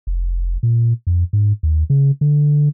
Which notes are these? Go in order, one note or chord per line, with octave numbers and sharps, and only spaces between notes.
F1
A#2
F2
G#2
D#2
C#3
D3